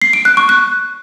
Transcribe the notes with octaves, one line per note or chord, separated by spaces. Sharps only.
C7
D7
F#6
C#6
F#6